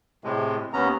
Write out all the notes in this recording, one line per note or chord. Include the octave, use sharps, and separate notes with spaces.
A2 C3 G#3
D#2 B3 C#4 A#5